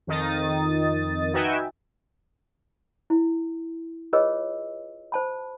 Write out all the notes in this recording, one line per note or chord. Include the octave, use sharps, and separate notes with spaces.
F2 D#3 D#4 D#6 A6
D#4 F#4 B4 E5 G5 G#5
E4
F4 G#4 B4 C#5 D#5 E6
C5 A5 B5